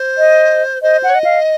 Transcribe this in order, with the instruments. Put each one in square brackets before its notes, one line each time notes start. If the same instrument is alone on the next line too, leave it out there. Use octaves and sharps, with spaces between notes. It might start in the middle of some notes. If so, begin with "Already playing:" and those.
Already playing: [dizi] C5
[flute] D#5
[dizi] C5 [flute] D#5
[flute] F#5
[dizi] C#5
D#5
[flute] F5